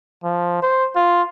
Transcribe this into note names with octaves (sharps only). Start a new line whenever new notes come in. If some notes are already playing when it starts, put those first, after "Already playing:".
F3
C5
F4